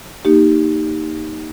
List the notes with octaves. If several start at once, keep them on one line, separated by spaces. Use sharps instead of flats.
A#3 D#4 G4